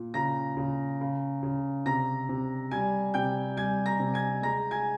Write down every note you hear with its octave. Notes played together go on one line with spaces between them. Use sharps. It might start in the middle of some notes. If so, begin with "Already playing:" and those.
Already playing: A#2
C#3 A#5 A#6
C#3
C#3
C#3
C3 A#5 A#6
C3
G3 G#5 G#6
C3 G5 G6
G3 G#5 G#6
A#5 A#6
C3
G#5 G#6
G#3 A#5 A#6
G#5 G#6